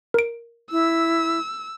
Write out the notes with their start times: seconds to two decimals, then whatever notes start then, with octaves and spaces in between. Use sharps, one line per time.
0.14 A#4 D7
0.72 E4 E6